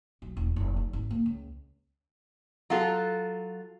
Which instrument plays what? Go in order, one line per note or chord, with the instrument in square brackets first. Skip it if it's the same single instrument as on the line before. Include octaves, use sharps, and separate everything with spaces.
[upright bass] B1
D#1
F1
D#4
G#1
A#3
C#2
[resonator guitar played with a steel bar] F#3 F4 A4